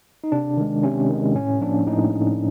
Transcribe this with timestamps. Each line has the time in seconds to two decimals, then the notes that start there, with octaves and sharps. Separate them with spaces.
0.24 D#4
0.32 C3 D4
0.57 D#3 G#3
0.83 C3 C#4
1.09 D#3 G#3
1.35 A2 C#4
1.61 F3 A#3 D4
1.87 A2 D#4